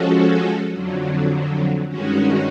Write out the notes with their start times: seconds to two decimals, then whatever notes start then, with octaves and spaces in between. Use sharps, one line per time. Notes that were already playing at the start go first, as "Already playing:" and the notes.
Already playing: F3 G#3 C#4 F#4 A4
0.71 F2 D3 F#3
1.89 G2 D#3 G#3 C#4 F#4